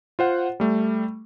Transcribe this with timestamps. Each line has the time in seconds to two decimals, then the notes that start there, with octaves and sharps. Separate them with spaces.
0.19 F4 C5 F#5
0.60 G3 A3